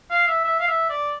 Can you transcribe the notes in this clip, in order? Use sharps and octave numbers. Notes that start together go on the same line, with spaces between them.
F5
E5
E5
F5
E5
D5